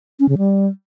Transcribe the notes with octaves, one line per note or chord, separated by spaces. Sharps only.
C#4
C#3
G3